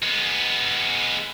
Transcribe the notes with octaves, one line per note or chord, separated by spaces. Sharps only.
G#3 B3